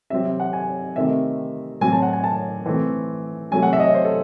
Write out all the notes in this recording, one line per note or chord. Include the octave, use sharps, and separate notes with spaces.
C3 F#3 C4 E5
E5
F#5
G#5
C3 D#3 A3 C4 E5
A2 F#3 C4 G#5
A5
F#5
G#5
A5
E3 A3 C4
C3 F#3 A3 G#5
F#5
E5
D#5
C#5
C5
A4